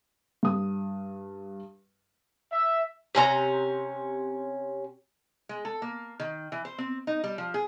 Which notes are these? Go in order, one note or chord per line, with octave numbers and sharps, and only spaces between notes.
G2 D#6
E5
C3 C#4 E4 A#5
G#3
A4
A#3
D#3
E3
C5
C4
D#4
G3
F3
G#4